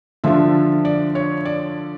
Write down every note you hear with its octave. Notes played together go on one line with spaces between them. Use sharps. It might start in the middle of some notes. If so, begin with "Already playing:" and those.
D3 F3 A3 D4 F4 E5
D5
C#5
D5